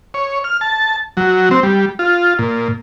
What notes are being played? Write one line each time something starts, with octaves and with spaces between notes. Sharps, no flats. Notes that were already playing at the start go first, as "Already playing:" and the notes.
C#5
F6
A5
F#3
C4
G3
F4
A#2